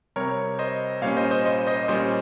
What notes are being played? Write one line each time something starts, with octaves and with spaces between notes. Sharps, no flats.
C3 G3 C4 A#4 C#5
C5 D#5
A#2 G3 A#3 C#4 C#5 F5
C5 D#5
C5 D#5
C5 D#5
C5 D#5
A#2 G3 C#4 C5 D#5